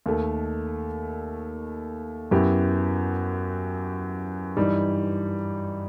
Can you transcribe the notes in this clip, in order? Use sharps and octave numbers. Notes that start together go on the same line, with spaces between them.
D#2 D#3 A3
F#2 F#3 B3 E4 G4
G2 E3 G3 D#4